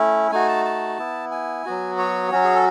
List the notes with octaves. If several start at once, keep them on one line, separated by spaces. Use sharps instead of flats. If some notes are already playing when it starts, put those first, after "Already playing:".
Already playing: A3 C#4 E4
A3 D#4 F#4 G#5
A5
A5
B3 E4
G#5
F#3 B3 F#4
C#5
F#3 C#4 F#4
G#4
A4